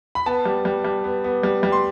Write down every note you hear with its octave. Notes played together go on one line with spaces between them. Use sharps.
B5
B3 A5
G3
G3
G3
B3
B3
G3
G3
C6